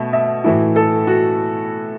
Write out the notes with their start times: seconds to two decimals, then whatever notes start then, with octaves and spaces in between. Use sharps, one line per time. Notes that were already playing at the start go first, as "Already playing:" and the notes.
Already playing: B2 A3 E5
0.13 E5
0.44 A2 E3 A3 E4 F#4
0.76 A4
1.07 F#4